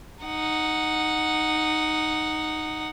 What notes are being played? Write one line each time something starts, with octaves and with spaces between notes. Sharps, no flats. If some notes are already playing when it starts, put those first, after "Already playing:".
D#4 F#5